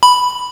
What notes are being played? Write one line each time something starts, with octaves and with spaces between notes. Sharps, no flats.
B5